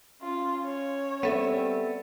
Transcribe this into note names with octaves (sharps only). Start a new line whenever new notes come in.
C#4 F4
C#5
G3 B3 C4 A4 E5